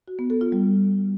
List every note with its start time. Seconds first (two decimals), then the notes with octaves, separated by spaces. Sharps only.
0.08 F#4
0.19 B3
0.30 A4
0.41 F4
0.52 G3